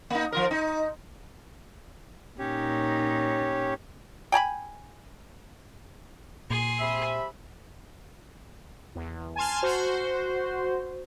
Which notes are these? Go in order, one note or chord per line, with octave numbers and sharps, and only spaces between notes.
A#3 D#4
F3 F4 A#4
D#4
A#2 C#4 D#4 G4 C#5
G5 G#5 A#5 B5
A#2 G#4 C6
C3 E5 B5
E2
G#5 A5 C6 F6
F#4 C5